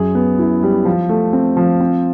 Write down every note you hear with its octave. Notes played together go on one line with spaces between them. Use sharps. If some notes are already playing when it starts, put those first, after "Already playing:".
Already playing: F#2 G#4
B3
E4
G3
F3
A3
C4
F3
C4